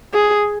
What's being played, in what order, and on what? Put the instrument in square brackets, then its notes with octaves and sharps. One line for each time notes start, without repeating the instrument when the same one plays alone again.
[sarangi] G#4